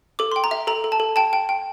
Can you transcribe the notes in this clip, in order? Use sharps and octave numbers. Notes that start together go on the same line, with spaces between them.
A4 D6
G5 C6
A#5
E5
A4 A#5
A4
A5
A4
G5 A5
G5
G5